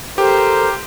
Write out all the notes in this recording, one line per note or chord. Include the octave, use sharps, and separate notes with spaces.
G4 A4 A#4 C5